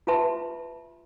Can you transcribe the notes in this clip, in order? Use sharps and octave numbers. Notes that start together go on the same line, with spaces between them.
F4 B4 E5 A5 C6